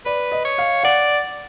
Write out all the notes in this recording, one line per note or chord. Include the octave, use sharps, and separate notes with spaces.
B4 D5
D#5
C#5
F5
D5 F#5